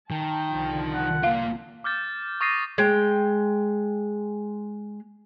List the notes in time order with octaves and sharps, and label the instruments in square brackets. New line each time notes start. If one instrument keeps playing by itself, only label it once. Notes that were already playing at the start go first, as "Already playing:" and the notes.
[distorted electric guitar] D#3 [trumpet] G5 [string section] A5
[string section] C2 D3 F3
[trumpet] F#5
[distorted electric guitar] A#3 F4 [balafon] F5
[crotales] D6 F6 G6 A6
C#6 D#6 A6 A#6 C7 D#7
[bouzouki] G#3 G5